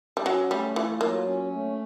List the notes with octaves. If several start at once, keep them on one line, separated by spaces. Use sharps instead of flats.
G3
F#3 C#4
G3 A3
E3 F4
F#3 A#3
C#4
A3